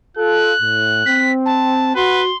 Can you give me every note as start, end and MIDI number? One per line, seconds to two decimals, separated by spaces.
0.17 0.52 65
0.17 0.52 69
0.17 1.33 90
0.61 1.05 45
1.05 1.94 60
1.05 1.31 95
1.45 1.95 81
1.96 2.29 66
1.96 2.22 71
1.96 2.36 84